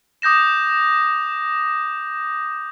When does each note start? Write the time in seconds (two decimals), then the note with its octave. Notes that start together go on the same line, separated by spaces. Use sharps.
0.22 D6 D#6 G6 A#6 E7